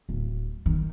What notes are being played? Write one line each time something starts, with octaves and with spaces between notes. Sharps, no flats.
D1
D#3